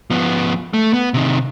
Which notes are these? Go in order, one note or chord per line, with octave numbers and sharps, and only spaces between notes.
F3 B3
A3
B3
C3 D#3